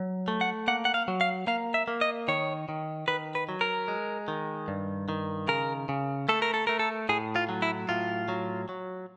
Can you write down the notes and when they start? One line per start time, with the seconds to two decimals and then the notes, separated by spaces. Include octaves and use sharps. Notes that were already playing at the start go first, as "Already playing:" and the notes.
Already playing: F#3
0.28 A3
0.41 F#5
0.68 A#3 F#5
0.85 F#5
0.94 F5
1.08 F#3
1.21 F5
1.47 A#3 F5
1.74 E5
1.88 A#3
2.01 D#5
2.28 D#3 C#5
2.69 D#3
3.08 D#3 B4
3.35 B4
3.49 F#3
3.61 A#4
3.88 G#3
4.28 D#3
4.68 G2
5.09 D#3
5.48 C#3 A#4
5.89 C#3
6.29 A3 A4
6.42 A#4
6.54 A4
6.67 A3 A#4
6.79 A4
7.09 A2 G#4
7.36 F4
7.49 F#3
7.62 E4
7.89 A2 F4
8.28 F#3
8.69 F#3